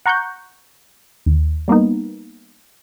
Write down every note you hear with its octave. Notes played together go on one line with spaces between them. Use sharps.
F#5 A#5 C#6 F#6 G6
D#2
G3 A#3 B3 D#4